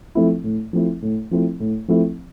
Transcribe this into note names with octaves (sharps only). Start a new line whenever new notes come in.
F3 A3 C4 E4
A2
F3 A3 C4 E4
A2
F3 A3 C4 E4
A2
F3 A3 C4 E4